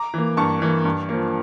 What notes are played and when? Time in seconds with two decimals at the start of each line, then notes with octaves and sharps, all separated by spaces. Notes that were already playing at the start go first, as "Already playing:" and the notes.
Already playing: A#5 D6
0.14 E3 A#3
0.37 G2 A5 C#6
0.62 E3 A#3
0.85 G2
1.09 F3 A#3